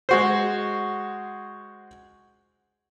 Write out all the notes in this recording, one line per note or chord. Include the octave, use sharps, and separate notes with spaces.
G#3 F#4 C5